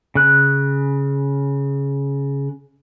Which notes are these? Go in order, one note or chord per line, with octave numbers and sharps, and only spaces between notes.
C#3 F#6